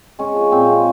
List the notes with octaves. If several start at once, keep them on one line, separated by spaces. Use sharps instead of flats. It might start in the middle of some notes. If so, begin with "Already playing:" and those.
G#3 C#4
F3
A#2 C4
G#3